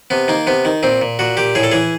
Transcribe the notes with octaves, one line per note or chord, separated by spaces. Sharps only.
C3 B3
D#3 A#3
C3 B3
D#3
A#2 C4
A#2
A#2 F#4
A#2 G4
A2 G#4
A4
E3 G#4